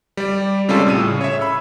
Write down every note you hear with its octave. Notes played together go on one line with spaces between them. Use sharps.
G3 D5
C3 G3 G#3 C#4 F4 A4
A2 E6 D#7
C#3
C#5 E5
B5 E6